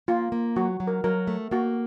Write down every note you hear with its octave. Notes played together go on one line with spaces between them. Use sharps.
A#3 F4
A#3
F#3 F#4
F#3
A#4
F#3 A#4
A3
A#3 F#4